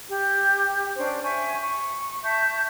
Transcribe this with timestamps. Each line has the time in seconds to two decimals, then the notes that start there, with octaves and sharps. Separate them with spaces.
0.09 G4
0.96 C#4 D4 C5 G5
1.24 E5 G5 G#5 C#6
1.61 C#6
2.23 E5 A5 C#6 G6